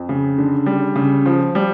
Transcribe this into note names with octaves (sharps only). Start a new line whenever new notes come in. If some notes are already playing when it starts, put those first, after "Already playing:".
Already playing: F2
C#3
D3
G3
C#3
F3
G3